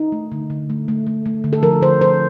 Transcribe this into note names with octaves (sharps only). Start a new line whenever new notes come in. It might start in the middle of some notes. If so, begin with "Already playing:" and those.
Already playing: D#4
A3
D3
D3
A3
A3
A3
A3
D3
A4
F3 A#4
D3 C5
F3 C5